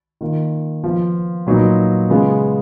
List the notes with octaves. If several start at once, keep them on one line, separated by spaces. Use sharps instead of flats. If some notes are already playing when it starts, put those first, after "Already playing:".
D#3 A#3 F4
F3 B3 F4
A#2 F#3 B3 D#4
C#3 G#3 B3 F4